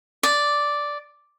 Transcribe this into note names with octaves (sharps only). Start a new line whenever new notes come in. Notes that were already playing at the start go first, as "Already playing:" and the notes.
D5